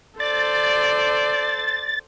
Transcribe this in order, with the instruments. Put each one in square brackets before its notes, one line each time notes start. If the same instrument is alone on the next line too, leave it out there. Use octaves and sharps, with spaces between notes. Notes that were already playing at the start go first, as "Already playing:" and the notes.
[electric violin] A4 C5 [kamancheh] D5 [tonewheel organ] A6